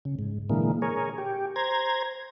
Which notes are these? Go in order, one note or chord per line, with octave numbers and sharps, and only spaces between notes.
C#3
G#2
A#2 D3 E3 G#3 A#3
G#4 A#4 C#5
G4
C5 A#5 G#6